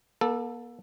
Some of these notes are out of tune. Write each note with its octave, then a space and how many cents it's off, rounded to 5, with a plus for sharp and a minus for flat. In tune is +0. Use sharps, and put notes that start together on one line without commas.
A#3 +45 A4 +0